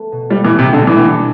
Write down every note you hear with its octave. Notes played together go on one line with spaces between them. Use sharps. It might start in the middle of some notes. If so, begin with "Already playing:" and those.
Already playing: A3 B3
B2
G3 F4
E3
B2
C3
B2 D3
E3 G3
D4